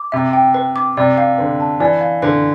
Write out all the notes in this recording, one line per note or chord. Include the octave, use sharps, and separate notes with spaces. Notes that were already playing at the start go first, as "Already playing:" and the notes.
Already playing: D6
C3 E5
G5
B4
D6
C3 D5
F5
D3 B4
A5
E3 D5
F5
D3 B4